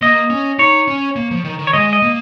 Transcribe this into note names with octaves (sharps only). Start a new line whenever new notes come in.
A#3 D#5
C#4
D#4 C#5
C#4
A#3
F3
D#3
D#3
C#5
G#3 D#5
D#5
A#3